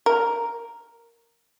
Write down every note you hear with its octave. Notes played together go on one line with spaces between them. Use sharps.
A#4